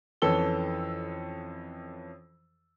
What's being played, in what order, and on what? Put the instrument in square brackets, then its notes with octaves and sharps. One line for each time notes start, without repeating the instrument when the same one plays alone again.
[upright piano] F2 E3 C#4 A4 E6 G7